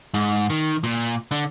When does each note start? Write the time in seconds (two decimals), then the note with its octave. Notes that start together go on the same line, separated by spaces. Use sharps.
0.14 G#2
0.50 D#3
0.84 A#2
1.31 D3